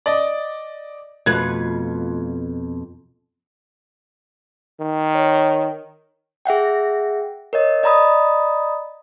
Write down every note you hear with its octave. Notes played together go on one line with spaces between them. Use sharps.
D5 D#5
F2 B2 A3 F4 B4 G#6
D#3
C#5
G#4 E5 F#5 G5
A#4 C#5 D#5
D5 D#5 A#5 B5 D#6